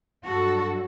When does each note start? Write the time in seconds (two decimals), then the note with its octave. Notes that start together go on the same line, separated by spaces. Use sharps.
0.25 G2 F#3 F#4 A4